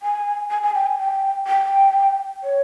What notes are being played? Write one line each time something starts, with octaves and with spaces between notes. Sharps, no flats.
G#5
G#5
G#5
G5
G#5
G5
G5
C#5